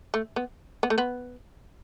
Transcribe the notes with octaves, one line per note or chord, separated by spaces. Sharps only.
A3
B3
B3
A3
B3